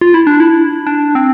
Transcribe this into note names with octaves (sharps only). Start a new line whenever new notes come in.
F4
E4
D4
E4
D4
C4